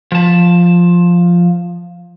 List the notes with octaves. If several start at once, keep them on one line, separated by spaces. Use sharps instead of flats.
F3 A5